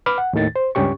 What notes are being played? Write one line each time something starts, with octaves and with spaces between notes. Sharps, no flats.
B4 B5 D6 F6
F#5
D#2 A2 D#3 A6
C5
C#2 G2 C#4 G4 C#6